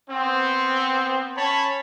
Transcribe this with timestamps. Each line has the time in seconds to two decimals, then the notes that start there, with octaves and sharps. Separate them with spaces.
0.10 B3 C4
1.37 C#4 C#5 A5 B5